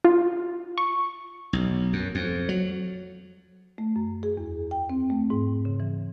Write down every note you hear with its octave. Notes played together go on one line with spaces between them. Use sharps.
F4
C#6
B1
F#2
F2
F#3
A3
F#2
G#4
E2
G5
C4
A3
G#2
C#3
E3